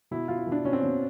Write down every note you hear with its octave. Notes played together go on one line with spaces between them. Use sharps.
B2 E4
B2 F4
E4
B2 D4
B2 C#4
C4
B2 C#4